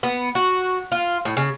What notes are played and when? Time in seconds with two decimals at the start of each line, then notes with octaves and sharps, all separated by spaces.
0.03 B3
0.35 F#4
0.92 F4
1.25 A2
1.37 C#3